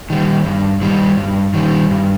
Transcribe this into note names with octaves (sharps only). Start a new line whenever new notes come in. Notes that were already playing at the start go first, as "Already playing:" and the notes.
D#3 G3
G2
D#3 G3
G2
D#3 G3
G2